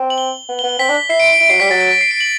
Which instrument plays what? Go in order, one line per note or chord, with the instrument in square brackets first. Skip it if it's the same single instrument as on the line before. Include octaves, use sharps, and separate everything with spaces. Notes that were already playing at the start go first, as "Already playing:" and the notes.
Already playing: [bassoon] C4
[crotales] F#7
G7
[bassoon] B3
[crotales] G7
[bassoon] B3
[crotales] G7
[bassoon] C4 [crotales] B6
[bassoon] D4
[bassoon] E4 [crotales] C7
[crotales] D7
D7
[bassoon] E4 [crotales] D7
[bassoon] F#3 [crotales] C7
[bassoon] G3 [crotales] B6
[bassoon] F#3 [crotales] A6
[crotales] A6
B6
C7
D7
F#7